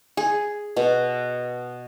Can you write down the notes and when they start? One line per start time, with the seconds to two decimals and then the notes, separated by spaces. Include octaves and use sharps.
0.17 G#4
0.76 B2